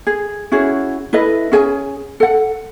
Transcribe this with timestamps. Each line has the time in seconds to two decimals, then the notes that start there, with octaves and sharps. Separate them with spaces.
0.07 G#4
0.52 C#4 E4 F#4 G#4
1.13 E4 A4 B4 D#5
1.52 C#4 G#4 G#5
2.20 A4 F#5